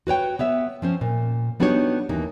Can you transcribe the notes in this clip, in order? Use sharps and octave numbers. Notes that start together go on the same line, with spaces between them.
F#4 B4 C#5 G5
B3 C#5 E5
F3 C#4 C5
A#2
G3 B3 D4 D#4 F#4 C#5
D#2 E3 A#3 D#4